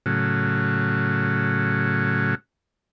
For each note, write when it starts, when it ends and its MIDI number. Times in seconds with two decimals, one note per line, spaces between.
0.06 2.35 45
0.06 2.35 49
0.06 2.35 54